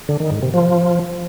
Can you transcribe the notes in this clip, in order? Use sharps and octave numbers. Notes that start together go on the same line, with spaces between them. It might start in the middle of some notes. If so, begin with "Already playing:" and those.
D3
D#3
G#2
C3
F3